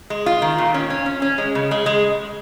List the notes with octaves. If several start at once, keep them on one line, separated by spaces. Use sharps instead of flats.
G#3
F4
D#3
A#2
C#4
C#4
C#4
C#4
G#3
C#3
G#3
G#3